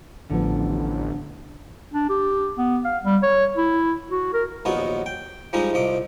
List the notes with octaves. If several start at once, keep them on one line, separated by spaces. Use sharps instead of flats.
A1 D3 F3 B3
D4
G4
B3
F5
G3
C#5
E4
F#4
A#4
A#1 D#2 F#3 B3 F#4 D#5
G5
F3 G3 G#3 D#4 D#5
C2 F3 D#5 D6